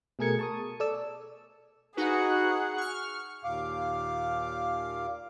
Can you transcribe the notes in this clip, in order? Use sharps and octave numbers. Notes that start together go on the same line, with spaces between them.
B2 A3 G#4 A#4 G#6 C#7
A5 C#6 D#6
A4 D5 E6
D#4 F#4 G#4 B4 F#5
C#6 F6
D#2 A#2 F5 D6